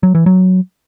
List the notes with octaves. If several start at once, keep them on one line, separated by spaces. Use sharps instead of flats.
F#3
E3
F#3